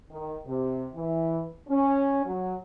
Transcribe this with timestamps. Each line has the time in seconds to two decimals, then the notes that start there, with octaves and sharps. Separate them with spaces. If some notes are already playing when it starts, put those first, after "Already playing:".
0.10 D#3
0.46 C3
0.95 E3
1.68 C#4
2.25 F#3